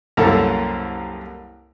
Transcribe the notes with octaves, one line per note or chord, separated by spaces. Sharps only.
C2 F#2 A#3 E4 A4